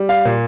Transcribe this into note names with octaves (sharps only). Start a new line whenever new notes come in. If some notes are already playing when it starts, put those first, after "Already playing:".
Already playing: G3
F5
A#2